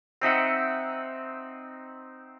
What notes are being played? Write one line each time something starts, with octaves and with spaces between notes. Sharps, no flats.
C4 D#4 E5 F#5